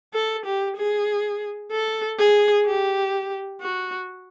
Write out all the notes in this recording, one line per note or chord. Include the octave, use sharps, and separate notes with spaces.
A4
G4
G#4
A4
G#4
G4
F#4